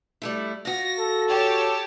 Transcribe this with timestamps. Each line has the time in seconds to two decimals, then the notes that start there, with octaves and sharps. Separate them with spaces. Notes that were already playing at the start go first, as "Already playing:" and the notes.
0.22 G3 A3 E4
0.65 F4 F#4 A#6
0.99 A4
1.28 G4 C#5 A5